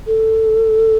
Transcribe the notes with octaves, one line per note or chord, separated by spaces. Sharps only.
A4